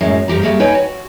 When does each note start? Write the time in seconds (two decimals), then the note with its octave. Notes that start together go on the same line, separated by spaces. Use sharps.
0.01 F#2 A2 F#3 G#3
0.28 G2 F3 G4 A#5
0.42 G3 A3 A#3 G#4
0.60 D#4 B4 C#5 D#5 G5 G#5
0.75 F#4